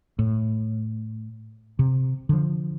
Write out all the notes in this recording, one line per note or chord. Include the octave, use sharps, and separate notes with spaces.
A2
C3
D3 F3